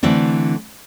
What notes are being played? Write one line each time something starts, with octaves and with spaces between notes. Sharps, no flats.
D3 E3 A3 C4 D4